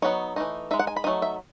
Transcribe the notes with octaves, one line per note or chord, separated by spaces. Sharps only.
F#3 B3 D#4 C#5
E3 A3 D#4
G#3 D#4 E5
F#5
G#5
B5
F#3 A3 D#4 G#5
E5